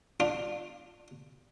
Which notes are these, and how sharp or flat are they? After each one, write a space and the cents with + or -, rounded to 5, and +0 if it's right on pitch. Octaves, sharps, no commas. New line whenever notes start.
D4 +20 F4 +0